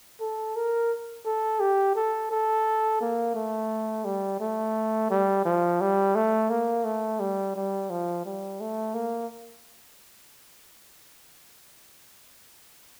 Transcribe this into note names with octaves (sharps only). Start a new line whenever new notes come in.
A4
A#4
A4
G4
A4
A4
A#3
A3
G3
A3
G3
F3
G3
A3
A#3
A3
G3
G3
F3
G3
A3
A#3